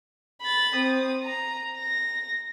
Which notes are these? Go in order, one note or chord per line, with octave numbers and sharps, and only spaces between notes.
B5 A6
C4 D#6
A#5
A#6